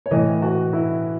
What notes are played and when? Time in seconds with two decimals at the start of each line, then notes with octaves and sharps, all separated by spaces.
0.06 C#5
0.11 A2 E3 D#5
0.42 F#4
0.73 E4